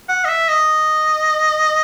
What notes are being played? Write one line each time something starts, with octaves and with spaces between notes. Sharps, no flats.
F#5
D#5
E5
D#5